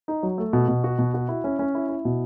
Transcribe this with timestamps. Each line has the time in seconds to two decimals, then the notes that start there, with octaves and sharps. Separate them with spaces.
0.08 D#4
0.23 F#3
0.38 A3
0.53 B2
0.68 B2
0.84 F#4
0.99 B2
1.14 F#4
1.29 E4
1.44 C#4
1.59 C#4
1.75 E4
1.89 E4
2.05 B2